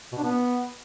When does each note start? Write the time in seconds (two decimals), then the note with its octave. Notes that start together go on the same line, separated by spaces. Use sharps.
0.12 B2
0.18 D4
0.23 B3